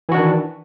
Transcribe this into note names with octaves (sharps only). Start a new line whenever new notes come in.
D#3 E3 D4 F#4